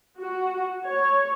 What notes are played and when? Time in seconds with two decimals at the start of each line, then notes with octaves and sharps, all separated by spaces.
0.18 F#4
0.86 C#5